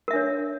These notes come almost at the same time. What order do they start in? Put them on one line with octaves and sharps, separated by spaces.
A#4 E5 D4 C#5